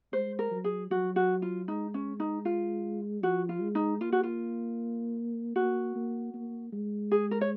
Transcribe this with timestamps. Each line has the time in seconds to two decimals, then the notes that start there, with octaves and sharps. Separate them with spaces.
0.13 G#3 C5
0.39 A#4
0.51 F#3
0.64 G#4
0.91 F#3 F#4
1.16 F#4
1.42 F4
1.68 G#3 D#4
1.94 C#4
2.20 D#4
2.45 F4
3.23 F3 F#4
3.49 F4
3.62 G#3
3.75 D#4
4.01 A#3 F4
4.12 F#4
4.23 F4
5.56 A#3 F#4
5.95 A#3
6.34 A#3
6.73 G#3
7.11 G#4
7.31 A#4
7.41 C#5